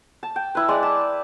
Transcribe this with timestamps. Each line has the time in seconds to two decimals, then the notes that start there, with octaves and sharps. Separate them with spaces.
0.23 A5
0.36 G5
0.55 E4 B4
0.68 G#3 D5
0.83 A5